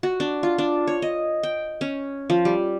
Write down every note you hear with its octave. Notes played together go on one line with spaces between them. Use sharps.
F#4
D4
F4
D4
C#5
D#5
G5
C#4
F3
G3